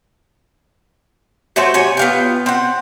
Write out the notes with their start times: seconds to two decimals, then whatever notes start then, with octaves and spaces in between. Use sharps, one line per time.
1.56 F#3 A3 F#4 C5
1.74 C3 C#5 G#5
1.97 B3 F4 G5
2.46 C4 F#5